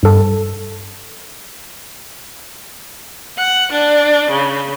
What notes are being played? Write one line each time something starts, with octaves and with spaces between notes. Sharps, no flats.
G2 A4
F#5
D4
C#3